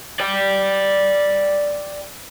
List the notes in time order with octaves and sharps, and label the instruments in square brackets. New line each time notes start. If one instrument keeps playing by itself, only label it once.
[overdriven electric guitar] D5 G5